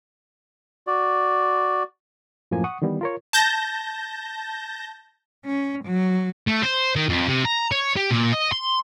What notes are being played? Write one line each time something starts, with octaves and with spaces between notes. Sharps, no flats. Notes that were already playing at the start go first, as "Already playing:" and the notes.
F#4 D5
F#2 A2 F3 A#3 G#5
F#5 C#6 D#6
D#3 E3 G3 B3
F4 A#4 C#5
A5 G6 A#6
C#4
F#3
A3
C5
D#3
F2
C3
A#5
C#5
G4
A#2
D#5
C6